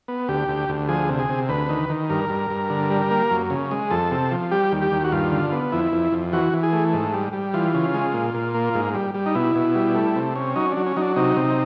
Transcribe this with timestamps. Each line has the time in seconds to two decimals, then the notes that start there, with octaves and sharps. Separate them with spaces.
0.08 B3
0.28 D2 G4
0.48 D2
0.69 D2
0.89 F3 G#4
1.09 C3
1.19 G#4
1.29 C3
1.49 D2 B4
1.69 D#3
1.89 D#3
2.10 G2 A#4
2.29 G2
2.50 G2
2.70 D3
2.90 G3
3.10 A#3
3.31 F#2
3.50 C#3
3.71 G#3
3.91 F2 A4
4.11 C3
4.31 F3
4.51 G3 G4
4.72 D#2
4.82 G4
4.92 D#2
5.04 F#4
5.12 G2 F4
5.31 D3
5.52 B3
5.72 F2 E4
5.92 F2
6.12 F2
6.33 E3 F#4
6.53 E3
6.63 G#4
6.73 A3
6.93 G#2
7.14 G3
7.33 G3
7.54 E3 F4
7.74 C#3
7.94 G#3
8.14 A#2
8.34 A#2
8.54 A#3
8.75 G#2
8.95 G3
9.14 G3
9.26 D#4
9.35 B2 E4
9.55 B2
9.75 G3
9.95 A3
10.16 C3
10.35 C#4
10.56 F#3 D#4
10.72 D4
10.77 F#3
10.86 C#4
10.96 F#3 D#4
11.02 D4
11.16 C3 D#4
11.37 C3